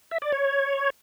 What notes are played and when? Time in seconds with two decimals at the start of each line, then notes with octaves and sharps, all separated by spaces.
0.11 E5
0.22 D5
0.32 C#5